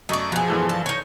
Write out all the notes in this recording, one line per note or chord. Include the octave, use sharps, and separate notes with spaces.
F#2 A3 D5 D#5 C#6
B2 F3 G#4
G2 E3 A4
A5
D#4 C#5